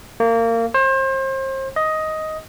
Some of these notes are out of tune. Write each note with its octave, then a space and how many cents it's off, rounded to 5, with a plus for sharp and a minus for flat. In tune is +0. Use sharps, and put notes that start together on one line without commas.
A#3 -25
C5 +35
D#5 +10